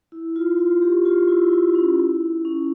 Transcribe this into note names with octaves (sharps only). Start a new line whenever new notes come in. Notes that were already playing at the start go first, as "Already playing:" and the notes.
E4
F4
F4
G4
F4
E4
E4
C#4
E4
C#4